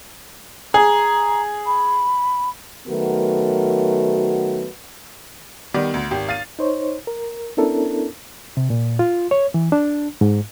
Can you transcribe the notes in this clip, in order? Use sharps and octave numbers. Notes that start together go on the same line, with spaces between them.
G#4 A#5
B5
D#3 F#3 A3 B3 F#4 A#4
D#3 G3 B3 D5
D2
G#1 G4
F5 A6 D#7
D#4 C5 C#5
A#4
B3 C#4 D4 E4 A4 A#4
C3
A#2
F4
C#5
E3
D4
G#2